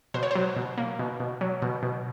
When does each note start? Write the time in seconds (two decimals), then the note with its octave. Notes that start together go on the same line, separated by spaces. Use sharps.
0.14 B2 C5
0.23 C#5
0.31 F#3 C5
0.56 B2
0.78 A#3
0.99 B2
1.20 B2
1.41 F#3
1.62 B2
1.83 B2